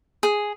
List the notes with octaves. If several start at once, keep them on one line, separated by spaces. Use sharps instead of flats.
G#4